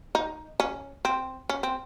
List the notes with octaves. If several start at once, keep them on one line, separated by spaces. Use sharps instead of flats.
D#4
C#4
C4
C#4
C4